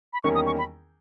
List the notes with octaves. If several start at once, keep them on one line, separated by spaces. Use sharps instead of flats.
B5
E2 D#3 G3 A#3 C#4 C#6
D#6
C#6
B5